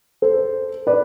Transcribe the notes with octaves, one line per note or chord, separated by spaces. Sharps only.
A4 C5
B4 D5